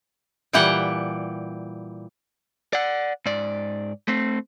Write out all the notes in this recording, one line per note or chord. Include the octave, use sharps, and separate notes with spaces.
A#2 E3 G3 G4 F#5 G5
D5 F#5
G#2 D5
A3 C4